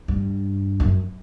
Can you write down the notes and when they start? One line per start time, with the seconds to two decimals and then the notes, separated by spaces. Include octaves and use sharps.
0.08 G2
0.80 F#2